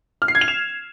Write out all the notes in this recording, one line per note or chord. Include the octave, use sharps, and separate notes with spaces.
F6
C7
G#6
F7
E7